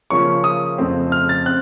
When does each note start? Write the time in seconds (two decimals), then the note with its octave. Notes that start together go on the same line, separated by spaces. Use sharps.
0.10 C#3 F3 A#3 C#4 C#6
0.44 D#6
0.78 F2 C#3 A3 C4
1.12 F6
1.29 A6
1.46 C4 F#6